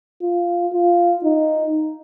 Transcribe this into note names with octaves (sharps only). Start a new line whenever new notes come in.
F4
F4
D#4